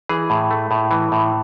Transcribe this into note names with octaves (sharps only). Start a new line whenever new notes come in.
E3 G#4
A2
A3
A2
E3
A2